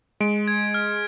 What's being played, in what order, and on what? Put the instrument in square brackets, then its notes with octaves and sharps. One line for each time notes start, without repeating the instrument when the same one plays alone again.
[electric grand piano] G#3 [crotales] D7
[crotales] G#6
F6